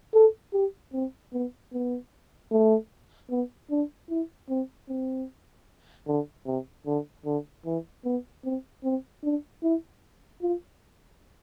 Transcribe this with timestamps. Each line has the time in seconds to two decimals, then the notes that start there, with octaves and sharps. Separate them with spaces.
0.14 A4
0.53 G4
0.93 C4
1.33 B3
1.73 B3
2.51 A3
3.30 B3
3.70 D4
4.10 E4
4.49 C4
4.89 C4
6.07 D3
6.46 C3
6.86 D3
7.26 D3
7.66 E3
8.05 B3
8.44 C4
8.84 C4
9.24 D4
9.63 E4
10.42 F4